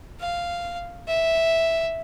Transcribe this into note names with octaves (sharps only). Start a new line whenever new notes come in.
F5
E5